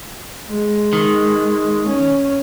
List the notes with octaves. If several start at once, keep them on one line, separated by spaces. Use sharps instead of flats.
G#3
D#3
C#4